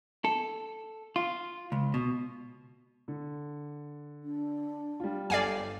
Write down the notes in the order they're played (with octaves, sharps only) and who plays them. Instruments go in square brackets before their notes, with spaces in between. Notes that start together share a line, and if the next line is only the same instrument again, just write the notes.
[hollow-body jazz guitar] A4
F4
C#2
B2
[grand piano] D3
[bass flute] D4
[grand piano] G3 F4
[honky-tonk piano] G1 A4 [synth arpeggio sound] D5 F5 G#5